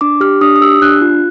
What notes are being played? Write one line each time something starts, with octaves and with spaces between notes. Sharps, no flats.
D4 D6
G4 F6
D4 D#6
D#6
G4 E6
D4 F#6
F4